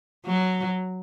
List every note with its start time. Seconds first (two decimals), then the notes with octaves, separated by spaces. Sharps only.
0.26 F#3